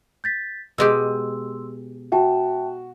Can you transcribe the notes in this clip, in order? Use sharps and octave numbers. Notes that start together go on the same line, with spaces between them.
G6 A6 B6
B2 G#3 G4 C6 E6
F#4 E5 G5 A5